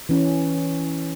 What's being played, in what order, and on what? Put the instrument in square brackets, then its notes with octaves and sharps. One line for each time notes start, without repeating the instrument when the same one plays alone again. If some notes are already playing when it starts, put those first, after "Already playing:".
[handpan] E3 C#4